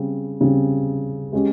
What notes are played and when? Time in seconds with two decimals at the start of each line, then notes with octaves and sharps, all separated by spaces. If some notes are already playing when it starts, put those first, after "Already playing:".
Already playing: C#3 G3 C4
0.41 C#3 G3 C4
1.32 G#3 C#4 G4